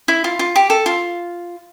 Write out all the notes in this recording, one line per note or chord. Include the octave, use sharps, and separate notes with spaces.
E4
F4
F4
G4
A4
F4